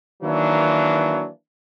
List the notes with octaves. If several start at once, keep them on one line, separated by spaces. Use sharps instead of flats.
D#3 E3 F#3 A#3 D4